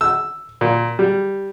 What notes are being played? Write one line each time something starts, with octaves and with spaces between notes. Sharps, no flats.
E6
A#2
G3